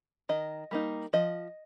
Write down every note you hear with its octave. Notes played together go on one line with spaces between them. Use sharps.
D#3 D#5
G3 A#3 D#4
F3 D#5